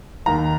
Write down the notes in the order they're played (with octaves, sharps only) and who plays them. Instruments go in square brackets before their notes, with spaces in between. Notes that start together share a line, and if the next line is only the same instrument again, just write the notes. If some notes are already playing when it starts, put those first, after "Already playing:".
[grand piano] D#2 D#3 A#5